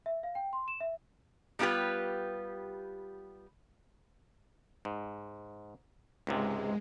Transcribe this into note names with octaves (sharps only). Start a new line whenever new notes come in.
E5
F5
G5
C6
E7
E5
G3 B3 F4 G4 B4
G#2
C#2 G#2 C3 G#3